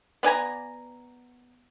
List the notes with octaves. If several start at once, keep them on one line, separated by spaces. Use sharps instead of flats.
B3 D5 G#5 A#5